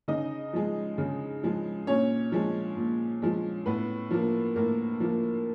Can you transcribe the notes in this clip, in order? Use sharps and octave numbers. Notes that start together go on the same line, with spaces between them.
C#3 D#4 D#5
F3 G#3
C#3
F3 G#3
A#2 C#4 C#5
F3 G#3
A#2
F3 G#3
A2 B3 B4
F3 A#3
A2 A#3 A#4
F3 A#3